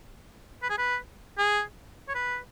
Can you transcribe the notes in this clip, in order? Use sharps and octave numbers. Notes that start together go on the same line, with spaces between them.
B4
G#4
B4
G#4
C#5
B4